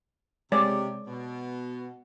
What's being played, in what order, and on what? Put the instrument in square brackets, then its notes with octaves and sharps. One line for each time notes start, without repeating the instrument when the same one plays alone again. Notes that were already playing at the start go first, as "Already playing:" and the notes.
[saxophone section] C3 [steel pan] G#3 C#5 D5
[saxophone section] B2